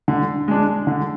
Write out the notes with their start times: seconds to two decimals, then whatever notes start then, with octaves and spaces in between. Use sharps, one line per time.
0.08 D3
0.48 G#3 D4
0.87 D3